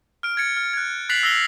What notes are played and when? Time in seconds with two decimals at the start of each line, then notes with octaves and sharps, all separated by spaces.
0.23 F6 D7
0.37 G#6 A6 C#7
0.57 F6
0.73 F#6 G#6
1.09 F#6 A6 B6 C7 F7 F#7
1.23 E6 A#6 C7 F7 G7